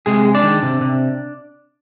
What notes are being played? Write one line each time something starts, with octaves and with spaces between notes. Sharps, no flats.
C3 G#3 G#4
G#3
D4 D5
D#3
C3
C3